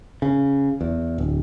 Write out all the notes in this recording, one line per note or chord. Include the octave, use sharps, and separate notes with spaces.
C#3
E2
D1